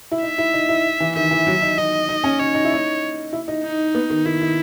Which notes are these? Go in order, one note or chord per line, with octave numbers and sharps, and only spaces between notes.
E4
D#4 E5
E4
D#4
E4
E3
D#3 E5
E3
F#3
D#4
D#4 D#5
D#4
C#4
D#4 C#5
D#4
E4
D#4
E4
D#4
D#4
B3
D#3
D#3 E4
D#3